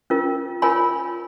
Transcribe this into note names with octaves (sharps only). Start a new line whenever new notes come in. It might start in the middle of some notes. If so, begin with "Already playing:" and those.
C#4 F4 A#4
F4 A#4 C#5 G#5 B5